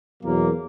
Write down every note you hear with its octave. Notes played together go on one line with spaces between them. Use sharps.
E2 B2 F#3 A#3